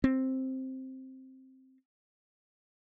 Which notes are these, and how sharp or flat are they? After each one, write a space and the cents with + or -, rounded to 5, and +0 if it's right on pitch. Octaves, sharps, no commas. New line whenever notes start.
C4 +5